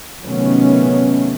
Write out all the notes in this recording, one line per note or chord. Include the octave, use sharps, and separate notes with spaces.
C3 D#3 F#3 A3 B3 C#4